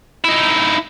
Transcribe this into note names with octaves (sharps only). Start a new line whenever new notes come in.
D#4 E4